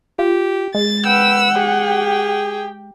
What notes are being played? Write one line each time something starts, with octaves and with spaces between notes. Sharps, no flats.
F4 G4
G#3 A6
B4 F#5 G5 E6
G4 G#4 G5